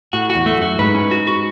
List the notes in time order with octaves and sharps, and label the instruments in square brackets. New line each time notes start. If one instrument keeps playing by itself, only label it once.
[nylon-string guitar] A2 [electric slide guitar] F#4
[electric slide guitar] F#4
[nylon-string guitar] E2
[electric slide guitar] A3
[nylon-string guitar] F#2 [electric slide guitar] F#4
[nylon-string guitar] G#2 [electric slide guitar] B4
[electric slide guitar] C#4
F#4
F#4